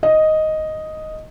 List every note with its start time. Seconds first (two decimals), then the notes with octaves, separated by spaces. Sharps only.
0.03 D#5